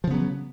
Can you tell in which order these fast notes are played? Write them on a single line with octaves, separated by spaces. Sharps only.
F3 C#3 B3 F#3